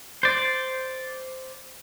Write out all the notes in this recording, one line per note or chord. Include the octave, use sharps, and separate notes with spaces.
C5 D5